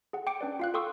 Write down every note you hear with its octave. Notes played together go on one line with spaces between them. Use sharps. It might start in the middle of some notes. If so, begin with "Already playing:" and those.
G#4 F#5
G5 D6 C#7 D7
C#4 D4 B4 D5
F4 F5 F#6
A4 G5 C6 C#6 D#6 E6